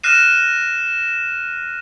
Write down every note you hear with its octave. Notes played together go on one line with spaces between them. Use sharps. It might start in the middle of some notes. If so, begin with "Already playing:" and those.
F6 F#6 A#6 C7 D#7 E7